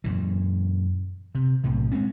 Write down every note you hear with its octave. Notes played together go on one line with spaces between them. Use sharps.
F#2 A#2 E3
C3
B1 A2 C3
G#3 A#3 C4 C#4